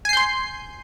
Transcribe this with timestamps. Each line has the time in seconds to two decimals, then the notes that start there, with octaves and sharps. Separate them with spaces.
0.05 G#5
0.09 C7
0.13 G6
0.17 C6